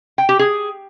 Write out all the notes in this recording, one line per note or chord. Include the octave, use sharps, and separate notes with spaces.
G5
G4
G#4